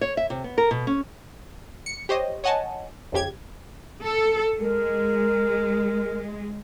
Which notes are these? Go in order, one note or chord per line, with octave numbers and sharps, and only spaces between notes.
C#5
E5
C3
B3
A#4
B2
C#4
C#7
G4 C5 C#5 D#5
C#5 D#5 F#5 G#5 A5
G1 F2 C#3 G4 G#6
A4
G#3 A#4